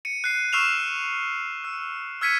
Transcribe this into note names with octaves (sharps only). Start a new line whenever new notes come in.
C#7 D#7
F#6 C7 D#7
C#6 E6 F6 C7 E7 F7
E6
E6 F6 G#6 B6 C#7 D#7